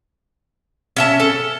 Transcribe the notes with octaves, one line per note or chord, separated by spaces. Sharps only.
C#4 E5 A5
A4